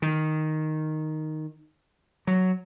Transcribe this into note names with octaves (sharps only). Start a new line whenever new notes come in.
D#3
F#3